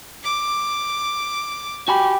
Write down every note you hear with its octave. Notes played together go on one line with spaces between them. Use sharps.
D6
F#4 G4 G#5 B5